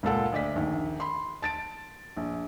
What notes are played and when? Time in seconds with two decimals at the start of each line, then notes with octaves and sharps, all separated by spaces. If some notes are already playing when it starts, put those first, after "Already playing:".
0.03 C#2 A#2 A4 F#5
0.33 D2 D5 D#5 B6
0.55 A#1 D#2
1.00 B5 C6
1.42 A5 A6 D7
2.17 A#1